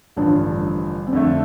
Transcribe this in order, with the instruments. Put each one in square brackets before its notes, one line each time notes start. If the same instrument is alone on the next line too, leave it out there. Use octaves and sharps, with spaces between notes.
[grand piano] A1 G2 D3 F3 [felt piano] D4
[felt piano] C4
[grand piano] F2 D3 A3 [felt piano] D4